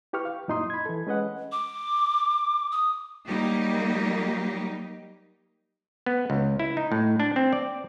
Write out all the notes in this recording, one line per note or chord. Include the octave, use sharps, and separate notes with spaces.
E4 G4 B4 C#6 F6
F5
F#2 A#2 D#4 E4 C6 D#6
B5 G#6
E3 A4
G#3 C#4 B4 D#5 F#5
D6
D#6
F#3 G3 A#3 D#4 G4
B3
C#2
E4
D#4
A2
D4
C4
D5